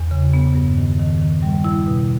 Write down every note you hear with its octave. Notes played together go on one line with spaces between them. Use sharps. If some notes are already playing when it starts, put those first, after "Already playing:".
Already playing: E2
C#3
B3
G2
D#3
D#3
D#3
G3
E4
B2